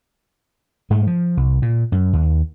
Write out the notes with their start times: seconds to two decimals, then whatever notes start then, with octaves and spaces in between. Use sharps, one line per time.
0.90 G#2 G#3 A3
1.07 F3
1.37 C2
1.62 A#2
1.92 F#2
2.13 D#2